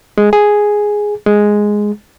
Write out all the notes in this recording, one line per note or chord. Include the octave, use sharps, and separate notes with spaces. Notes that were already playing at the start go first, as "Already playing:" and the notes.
G#3
G#4
G#3